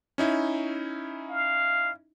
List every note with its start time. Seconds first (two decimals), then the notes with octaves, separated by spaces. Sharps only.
0.18 C#4 D#4 E4
1.30 F5